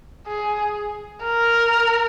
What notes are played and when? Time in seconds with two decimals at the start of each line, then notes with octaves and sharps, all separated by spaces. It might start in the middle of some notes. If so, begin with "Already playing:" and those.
0.27 G#4
1.23 A#4